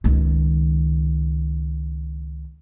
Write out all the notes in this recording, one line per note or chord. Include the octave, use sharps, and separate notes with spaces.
C#2 D#3